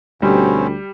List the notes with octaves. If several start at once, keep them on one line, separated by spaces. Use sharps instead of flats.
D2 B2 G3 C4 C#4